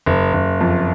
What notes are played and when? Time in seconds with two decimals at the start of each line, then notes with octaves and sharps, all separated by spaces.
0.06 F#1
0.33 F#1
0.61 F2